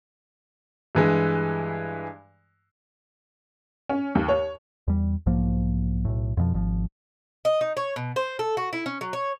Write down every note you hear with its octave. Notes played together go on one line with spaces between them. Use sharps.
G2 E3 G#3
C#4
D#2
C#5
E2 G3
B1 G#2 F3 A#3
B1 A2
F2 B2 D#3 F3
G#1 F3
D#5
D#4
C#5
B2
C5
A4
F#4
E4
C#4
F#3
C#5